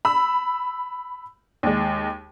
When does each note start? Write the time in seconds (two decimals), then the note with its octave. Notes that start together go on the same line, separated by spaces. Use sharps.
0.05 B5 E6
1.63 D#2 G#3